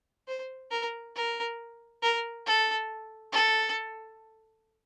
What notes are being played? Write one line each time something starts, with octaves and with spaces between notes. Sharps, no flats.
C5
A#4
A#4
A#4
A4
A4